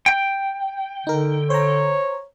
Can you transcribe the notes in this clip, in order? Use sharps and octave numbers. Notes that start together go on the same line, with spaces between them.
G5
D3 D#4 A#4
C5 C#5 A#5